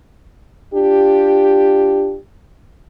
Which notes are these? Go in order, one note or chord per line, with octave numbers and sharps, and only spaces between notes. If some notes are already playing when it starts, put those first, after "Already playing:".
D4 F4 G4